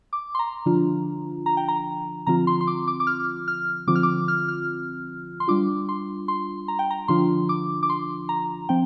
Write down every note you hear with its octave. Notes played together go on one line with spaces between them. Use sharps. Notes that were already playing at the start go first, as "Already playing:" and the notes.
D6
C6
A#5
D3 F3 D4 F4
A#5
G5
A#5
D3 F3 C4 F4 A#5
C6
C6
D6
D6
D6
F6
F6
D3 F3 C4 F4 D6
F6
D6
F6
F6
C6
G3 D4 F4 D6
C6
C6
A#5
G5
A#5
D3 F3 D4 F4 C6
D6
D6
C6
A#5
F3 C4 G5